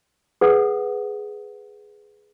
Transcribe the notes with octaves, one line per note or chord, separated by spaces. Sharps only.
G#4 B4 F#5 D#6